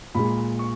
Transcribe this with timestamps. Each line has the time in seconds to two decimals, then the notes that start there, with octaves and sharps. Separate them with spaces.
0.15 A#2 G#3 B5
0.59 C#6